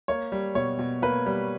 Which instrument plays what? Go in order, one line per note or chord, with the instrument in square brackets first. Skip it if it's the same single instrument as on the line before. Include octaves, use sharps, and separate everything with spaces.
[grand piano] A#3 C#5
G3
B2 C#5
B2
A#3 B4
G3